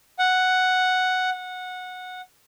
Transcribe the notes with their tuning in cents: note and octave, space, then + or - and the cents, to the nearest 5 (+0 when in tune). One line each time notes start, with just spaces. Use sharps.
F#5 +0
F#5 -15